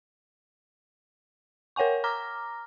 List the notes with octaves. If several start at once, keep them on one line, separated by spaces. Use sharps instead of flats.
A#4 C#5 F#5 G#5 C#6
A#5 D6 F6 A#6